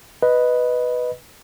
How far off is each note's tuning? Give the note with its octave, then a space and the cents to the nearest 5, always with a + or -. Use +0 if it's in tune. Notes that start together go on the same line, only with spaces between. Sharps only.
B4 +0 D#5 +0